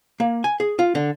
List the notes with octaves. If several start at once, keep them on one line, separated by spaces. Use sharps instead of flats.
A#3
G#5
G#4
F4
D3